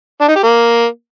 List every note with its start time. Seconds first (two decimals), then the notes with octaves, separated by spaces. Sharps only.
0.21 D4
0.28 D#4
0.36 G4
0.43 A#3